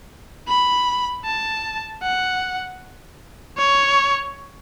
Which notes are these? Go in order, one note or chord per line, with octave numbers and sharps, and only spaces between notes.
B5
A5
F#5
C#5